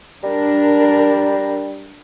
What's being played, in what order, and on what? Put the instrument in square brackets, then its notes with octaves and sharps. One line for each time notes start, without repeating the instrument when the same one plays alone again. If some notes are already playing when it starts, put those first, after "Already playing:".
[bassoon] G3 [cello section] D4 A#4